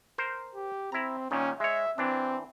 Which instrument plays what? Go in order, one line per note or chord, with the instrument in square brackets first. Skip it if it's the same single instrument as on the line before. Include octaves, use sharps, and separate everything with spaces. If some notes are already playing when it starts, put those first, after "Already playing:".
[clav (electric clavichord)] A#4 C5
[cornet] G4
[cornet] C4 [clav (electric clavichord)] E4 A#5
[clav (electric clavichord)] A#2 D#3 [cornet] C#4
[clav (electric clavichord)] G#3 C#5 [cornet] E5
[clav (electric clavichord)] E3 D4 [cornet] C4